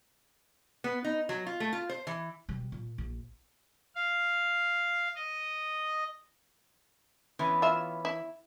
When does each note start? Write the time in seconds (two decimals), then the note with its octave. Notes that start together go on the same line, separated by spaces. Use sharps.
0.84 B3
1.04 D#4
1.29 F#3
1.47 F4
1.60 A3
1.73 F4
1.89 C5
2.07 E3
2.49 B2 G3
2.72 A#2
2.98 A#1
3.95 F5
5.15 D#5
7.39 E3 B3 C#4
7.62 F4 E5
8.05 E4